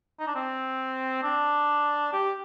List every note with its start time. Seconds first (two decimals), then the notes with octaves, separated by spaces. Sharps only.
0.20 D#4
0.27 D4
0.35 C4
1.23 D4
2.13 G4